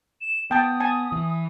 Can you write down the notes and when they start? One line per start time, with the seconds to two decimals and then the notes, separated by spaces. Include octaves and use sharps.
0.21 E7
0.51 B3 G5 A5 D#6
0.80 G#5 A5
1.12 E3